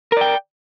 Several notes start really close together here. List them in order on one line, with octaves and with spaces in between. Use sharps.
A#4 D5 G5